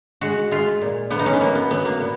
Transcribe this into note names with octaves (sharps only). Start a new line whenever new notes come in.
G#3 F#4
G#3 F4
A#2
F3 B3
D#4
C#4
B3
F#3 A#3
B3
F#3 B3
A#3
A#2 B3